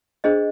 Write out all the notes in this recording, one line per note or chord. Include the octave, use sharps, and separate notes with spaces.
D4 G#4 C5 D#5